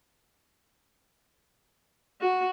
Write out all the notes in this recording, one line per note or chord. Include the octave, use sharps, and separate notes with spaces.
F#4